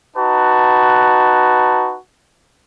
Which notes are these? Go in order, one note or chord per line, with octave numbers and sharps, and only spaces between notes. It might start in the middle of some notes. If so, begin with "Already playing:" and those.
D#4 F#4 B4 A5